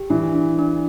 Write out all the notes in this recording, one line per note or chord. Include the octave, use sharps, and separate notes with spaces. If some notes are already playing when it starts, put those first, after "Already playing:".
Already playing: G4
E3 D4
D4
D4